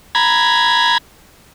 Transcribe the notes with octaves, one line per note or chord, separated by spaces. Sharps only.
A#5 B5 G#6